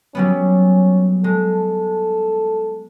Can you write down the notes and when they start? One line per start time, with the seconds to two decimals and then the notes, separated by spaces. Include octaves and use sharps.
0.15 F#3 G3 B3 C#4
1.24 G#3 A4